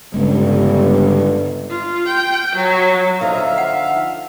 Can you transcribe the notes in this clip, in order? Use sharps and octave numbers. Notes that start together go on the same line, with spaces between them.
G1 G2 C#3 G#3
F4
G5
F#3
D3 F3 D#4 E5 F5
F#5